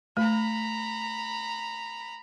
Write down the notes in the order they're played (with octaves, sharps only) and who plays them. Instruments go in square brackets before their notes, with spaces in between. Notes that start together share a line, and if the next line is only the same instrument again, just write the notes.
[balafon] A3 [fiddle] A#5 B5